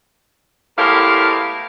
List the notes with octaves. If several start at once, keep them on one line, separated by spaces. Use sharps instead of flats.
E2 A2 G#3 G4 A#4 F5